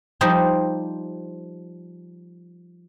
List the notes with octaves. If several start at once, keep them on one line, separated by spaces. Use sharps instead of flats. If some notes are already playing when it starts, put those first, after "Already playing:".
F3 G3 D#4 C5